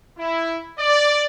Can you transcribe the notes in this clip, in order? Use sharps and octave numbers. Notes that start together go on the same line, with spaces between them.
E4
D5